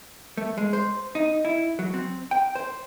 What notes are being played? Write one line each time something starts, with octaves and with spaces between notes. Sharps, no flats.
A3
G#3
C5
D#4
E4
F#3
C4
G5
C5